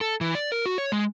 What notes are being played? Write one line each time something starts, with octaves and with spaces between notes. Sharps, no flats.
A4
E3
D5
A#4
F#4
C#5
G#3